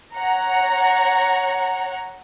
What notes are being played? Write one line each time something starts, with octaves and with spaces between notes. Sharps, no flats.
C#5 F#5 A#5